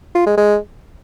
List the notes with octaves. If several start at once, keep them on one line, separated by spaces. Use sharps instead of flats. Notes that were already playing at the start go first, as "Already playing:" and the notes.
F4
G#3
G#3